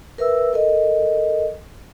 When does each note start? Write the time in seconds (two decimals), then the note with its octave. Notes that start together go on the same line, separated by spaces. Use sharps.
0.18 A#4 B4 E5 E6
0.53 A4 A#4 D#5